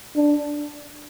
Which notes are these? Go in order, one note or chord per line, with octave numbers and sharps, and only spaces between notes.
D4